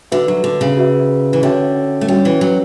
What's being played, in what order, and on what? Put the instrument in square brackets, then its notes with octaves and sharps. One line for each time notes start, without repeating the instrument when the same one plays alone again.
[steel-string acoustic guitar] D3 [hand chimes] F#4 B4 E5
[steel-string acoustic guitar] F#3
D3
C#3
[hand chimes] F#4 B4 E5
[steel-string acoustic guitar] E3
[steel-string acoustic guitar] D3 [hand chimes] C#4 F#4 C#5 E5 G5
[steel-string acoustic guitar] A3
[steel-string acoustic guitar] G3 [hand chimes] C#4 F#4 C#5 E5 G5
[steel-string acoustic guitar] E3
F#3